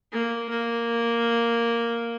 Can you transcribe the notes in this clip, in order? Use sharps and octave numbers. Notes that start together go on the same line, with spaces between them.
A#3
A#3